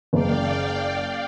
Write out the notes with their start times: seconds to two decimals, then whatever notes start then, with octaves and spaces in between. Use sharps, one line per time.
0.13 F#1 A#3 D5 F5 G5